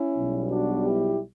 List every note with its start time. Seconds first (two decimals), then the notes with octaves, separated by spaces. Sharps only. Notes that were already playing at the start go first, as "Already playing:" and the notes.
Already playing: C#4 E4
0.17 B1 B2 G3
0.50 D4 F#4
0.85 E4 G4